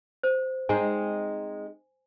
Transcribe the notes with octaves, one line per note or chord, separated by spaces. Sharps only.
C5
G#3 C4 D#4 G#5